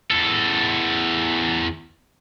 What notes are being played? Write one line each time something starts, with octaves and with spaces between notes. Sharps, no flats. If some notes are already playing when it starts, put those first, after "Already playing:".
E2 A4